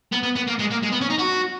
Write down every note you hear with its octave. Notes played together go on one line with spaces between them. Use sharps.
B3
B3
B3
A#3
G#3
A#3
G#3
B3
C#4
D#4
F#4